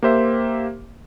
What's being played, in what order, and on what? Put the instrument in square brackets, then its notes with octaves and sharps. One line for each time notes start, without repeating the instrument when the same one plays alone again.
[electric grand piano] A#3 G4 C5 E5